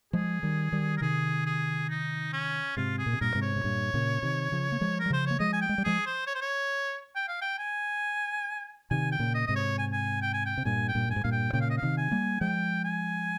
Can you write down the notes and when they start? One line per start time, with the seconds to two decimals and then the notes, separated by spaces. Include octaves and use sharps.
0.13 F3 G#3 G#4
0.43 D#3 G3
0.72 D#3 G3
0.97 A#4
1.01 C3 D#3 G#4
1.46 G#4
1.89 D#4
2.33 C#4
2.77 G#2 C3 F4
2.98 G#4
3.06 A#2
3.13 C3
3.21 G2 A#2 A#4
3.35 G#2 C3
3.42 C#5
3.56 C3
3.64 G2 A#2
3.94 A#2 C#3
4.23 C3 D#3
4.52 C#3 F3
4.72 A#3
4.81 F3 G#3
5.00 A#4
5.06 G3
5.10 C#3 F3 C5
5.26 A#3 C#5
5.39 F3 G#3 D#5
5.53 G#5
5.61 G5
5.69 G#3
5.78 G3
5.84 F3 G#3 G#4
6.06 C5
6.27 C#5
6.35 C5
6.41 C#5
7.15 G5
7.28 F5
7.41 G5
7.59 G#5
8.91 C3 D#3 G#5
9.12 G5
9.20 A#2 C#3
9.35 D#5
9.47 G#2 C3 D#5
9.56 C#5
9.78 G#5
9.92 G#5
10.22 G5
10.33 G#5
10.46 G5
10.57 C3
10.65 G2 A#2 G#5
10.88 G5
10.95 G2 A#2
11.09 G2 G#5
11.16 G#2
11.24 G2 A#2 F5
11.32 G5
11.53 A#2 C#3 G5
11.61 F5
11.70 D#5
11.77 F5
11.82 C3 D#3
11.98 G#5
12.11 G3 A#3
12.41 F3 G#3 G5
12.85 G#5